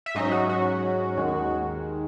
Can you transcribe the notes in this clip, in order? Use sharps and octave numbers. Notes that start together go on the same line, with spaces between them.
E5
G#2 F#3 C#4 D#4 D#5
F#4
F#4
D#2 D#3 G#3